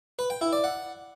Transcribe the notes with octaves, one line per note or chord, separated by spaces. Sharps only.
B4
G5
E4
D5
F#5